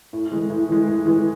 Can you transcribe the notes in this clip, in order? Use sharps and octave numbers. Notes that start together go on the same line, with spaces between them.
A2
E3 G#3
A2
E3 G#3
A2
E3 G#3